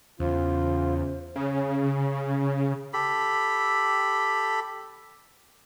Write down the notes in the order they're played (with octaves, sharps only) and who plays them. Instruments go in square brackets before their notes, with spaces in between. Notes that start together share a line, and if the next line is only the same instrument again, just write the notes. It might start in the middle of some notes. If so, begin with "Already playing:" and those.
[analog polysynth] E2 [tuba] C#3 [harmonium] F4 [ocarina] C5
[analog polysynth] C#3
[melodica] G4 A4 B5